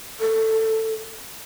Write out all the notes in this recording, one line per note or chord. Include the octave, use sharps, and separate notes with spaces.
A4